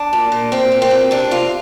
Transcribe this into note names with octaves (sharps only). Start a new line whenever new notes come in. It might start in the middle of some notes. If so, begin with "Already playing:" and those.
Already playing: D4
A#2
A#2
A#2 C4
A#2
C4
A#2
C3 D4
C3 F4